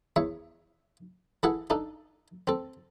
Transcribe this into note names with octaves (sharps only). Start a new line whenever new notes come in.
E2 C#5 E5
E3 E4 G#4 A4 F#5
D4 D#4 A4
C4 A4